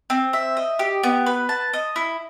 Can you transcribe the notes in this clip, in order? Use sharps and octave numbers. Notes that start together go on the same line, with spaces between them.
C4
E5
D#5
G4
B3
B4
A5
D#5
E4